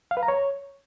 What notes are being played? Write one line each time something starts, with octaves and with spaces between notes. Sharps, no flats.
F5
B4
A#5
C#5